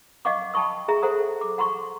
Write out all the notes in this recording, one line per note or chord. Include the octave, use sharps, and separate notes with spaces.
D#5 F5 F#5 C#6 D6
G5 A5 B5 C#6 D#6
G#4 E5 A#5
A4 C5 F#5 A#5 D#6
D6
F#5 A#5 C6 C#6